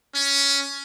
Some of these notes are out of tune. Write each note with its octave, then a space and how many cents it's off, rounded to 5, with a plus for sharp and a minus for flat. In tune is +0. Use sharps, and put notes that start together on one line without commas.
C#4 +10